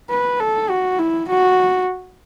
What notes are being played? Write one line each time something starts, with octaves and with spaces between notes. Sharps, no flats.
B4
A4
F#4
E4
F#4